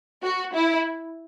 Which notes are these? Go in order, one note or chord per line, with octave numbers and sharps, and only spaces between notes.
F#4
E4